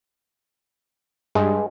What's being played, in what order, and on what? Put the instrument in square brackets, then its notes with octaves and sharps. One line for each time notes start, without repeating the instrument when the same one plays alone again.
[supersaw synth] G2 [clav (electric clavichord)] G#3